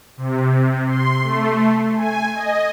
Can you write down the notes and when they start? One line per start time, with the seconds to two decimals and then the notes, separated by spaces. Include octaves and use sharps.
0.17 C3
0.86 C6
1.23 A3
1.96 G#5
2.34 D#5